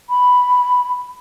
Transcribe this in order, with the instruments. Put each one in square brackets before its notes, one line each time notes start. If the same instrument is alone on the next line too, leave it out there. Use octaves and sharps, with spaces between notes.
[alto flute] B5